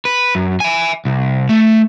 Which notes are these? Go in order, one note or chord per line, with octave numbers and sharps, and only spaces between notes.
B4
F#2
E5 G#5
C2
A3